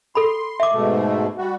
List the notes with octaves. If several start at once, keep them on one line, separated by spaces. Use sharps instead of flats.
A4 B5 C6
E5 D6
G#2 B2 A3
G3 F#4